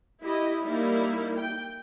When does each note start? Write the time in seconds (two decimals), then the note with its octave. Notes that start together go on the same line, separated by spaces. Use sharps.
0.23 E4 G4 D#5
0.63 G3 A#3 D#4 E4
1.38 G5